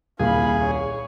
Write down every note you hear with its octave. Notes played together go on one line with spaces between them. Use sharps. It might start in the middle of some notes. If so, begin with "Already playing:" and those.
D#1 C2 A#2 G#4 F5 B5
C#5